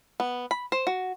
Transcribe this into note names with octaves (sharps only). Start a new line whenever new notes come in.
B3
B5
C5
F#4